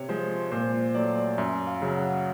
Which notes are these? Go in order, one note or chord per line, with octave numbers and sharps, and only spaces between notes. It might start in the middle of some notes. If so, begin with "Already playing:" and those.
Already playing: C3 C#5
F3 G#3 C5
A#2 C5
F#3 A3 D5
F#2 E5
F5
C#3 F#3
F#5